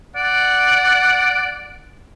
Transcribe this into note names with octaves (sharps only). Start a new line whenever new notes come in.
D5 F#5